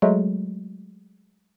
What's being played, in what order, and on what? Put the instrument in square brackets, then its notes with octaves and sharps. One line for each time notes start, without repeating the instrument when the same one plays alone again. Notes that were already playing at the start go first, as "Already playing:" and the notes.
[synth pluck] F#3 G#3 A3